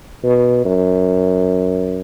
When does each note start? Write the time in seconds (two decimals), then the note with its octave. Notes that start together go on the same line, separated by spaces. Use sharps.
0.24 B2
0.65 F#2